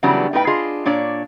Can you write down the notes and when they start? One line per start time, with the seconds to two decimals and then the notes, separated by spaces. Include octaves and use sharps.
0.03 C#3 E3 F#3 G3 B3 D4
0.33 A2 D#4 B4 G5
0.47 D4 F4 G#4 D#5
0.85 A#2 D4 C#5 D5